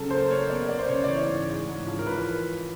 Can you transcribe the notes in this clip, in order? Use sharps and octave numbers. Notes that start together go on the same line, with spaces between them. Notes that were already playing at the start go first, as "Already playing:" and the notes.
Already playing: C#3 F#3 A4
A#3 C5
A#3 C#5
B3 D5
B3 D5
C5
C#3 C#5
D5
E3 C#5
G#2
G#3
G#2
F3
A#4
E3 B4